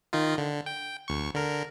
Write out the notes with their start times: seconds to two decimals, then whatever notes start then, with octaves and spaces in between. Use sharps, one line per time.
0.13 D#3 D#4 F4
0.38 D3
0.66 G5
1.08 D2 C#6
1.35 D3 A#4